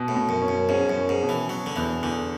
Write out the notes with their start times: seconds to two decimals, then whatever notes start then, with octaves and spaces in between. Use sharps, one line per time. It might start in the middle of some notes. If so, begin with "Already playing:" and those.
Already playing: B2
0.08 A2
0.15 B2
0.29 F#2
0.42 C#4
0.48 F#2
0.69 G#2 C#4
0.90 F#2
0.96 C#4
1.09 G#2
1.23 B2
1.29 E3
1.49 B2 F#3
1.66 D3
1.76 E2 E3
2.03 E2 D3